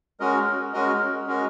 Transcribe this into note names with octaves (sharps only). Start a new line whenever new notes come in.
G#3 C#4 F#4 A#4 D#5
G#3 C#4 F#4 A#4 D#5
G#3 C#4 F#4 A#4 D#5